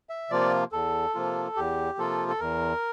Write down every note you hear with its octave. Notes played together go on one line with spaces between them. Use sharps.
E5
C3 F3 A#3 F4 D5
E2 A4
C3 F3 A#3 F4
E2 G4
C3 F3 A#3 F4 A4
A4
E2 A#4